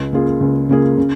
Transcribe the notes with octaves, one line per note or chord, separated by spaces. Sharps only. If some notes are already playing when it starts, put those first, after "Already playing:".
Already playing: C#2
C#3 A#3 F4 G#4
C#2
C#3 A#3 F4 G#4
C#3